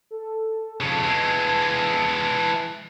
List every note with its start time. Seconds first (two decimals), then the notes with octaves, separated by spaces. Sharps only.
0.11 A4
0.81 F2 C#3 A5
1.03 E3 G#3